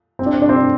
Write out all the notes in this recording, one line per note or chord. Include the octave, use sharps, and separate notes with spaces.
C4
D4
C4
D4
C4
D4